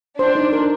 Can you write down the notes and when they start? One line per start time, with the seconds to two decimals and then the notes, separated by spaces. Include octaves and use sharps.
0.18 D4 C5
0.35 D#4
0.53 A#4